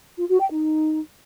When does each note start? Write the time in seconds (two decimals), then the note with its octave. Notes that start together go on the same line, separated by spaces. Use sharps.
0.19 F4
0.29 F#4
0.40 G5
0.50 D#4